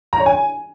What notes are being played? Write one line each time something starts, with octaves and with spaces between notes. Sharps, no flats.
A#5
C#5
G#5